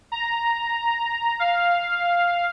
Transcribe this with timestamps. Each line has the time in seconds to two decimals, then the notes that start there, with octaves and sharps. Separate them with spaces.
0.12 A#5
1.39 F5